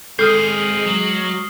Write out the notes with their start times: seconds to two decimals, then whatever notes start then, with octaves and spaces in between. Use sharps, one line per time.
0.19 G#3 C4 G#4 A4 D#6 F6 C7
0.86 F#3